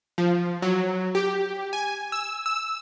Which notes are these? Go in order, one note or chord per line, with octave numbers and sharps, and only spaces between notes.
F3
F#3
G4
G#5
E6
E6